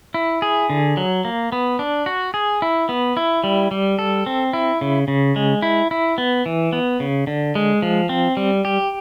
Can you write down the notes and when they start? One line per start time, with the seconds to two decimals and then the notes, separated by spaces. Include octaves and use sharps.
0.14 E4
0.42 G#4
0.70 D3
0.97 F#3
1.25 A#3
1.52 B3
1.79 D4
2.06 F#4
2.34 G#4
2.62 E4
2.89 B3
3.17 E4
3.44 G3
3.71 G3
3.99 A4
4.26 C4
4.53 E4
4.81 C#3
5.08 C#3
5.36 G#3
5.62 E4
5.91 E4
6.18 B3
6.46 E3
6.73 B3
7.00 C#3
7.27 D3
7.55 G#3
7.82 F3
8.09 C4
8.37 G3
8.65 G4